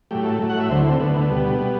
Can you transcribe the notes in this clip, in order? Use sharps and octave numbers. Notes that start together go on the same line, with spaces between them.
A2 F#3 A3 G4
A4
A2 F#3 A3
F#5
E5
D2 D3 A3 C5
E4
C4
D2 D3 A3 B3
B2 G3
B2 G3